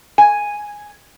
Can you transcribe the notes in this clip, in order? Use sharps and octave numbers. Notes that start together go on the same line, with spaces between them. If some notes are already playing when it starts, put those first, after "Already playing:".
G#5